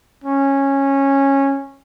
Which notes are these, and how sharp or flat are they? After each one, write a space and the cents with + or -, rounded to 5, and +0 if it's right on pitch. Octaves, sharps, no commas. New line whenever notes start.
C#4 -10